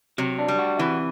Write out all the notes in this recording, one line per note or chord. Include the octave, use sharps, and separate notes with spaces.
C3 F#3
D4
G3
F#4
C3 E3